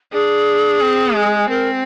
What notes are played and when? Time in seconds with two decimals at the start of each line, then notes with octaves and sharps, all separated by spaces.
0.13 D4 G#4
0.81 C4
1.15 G#3
1.49 C4 A#4